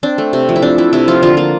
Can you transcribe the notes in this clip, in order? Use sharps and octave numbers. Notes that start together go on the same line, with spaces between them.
C4 D4
A3
C3
F3
E4
C4 D4
A3 E4
C3 E4
F3 F4
D3 F4
A#3 F4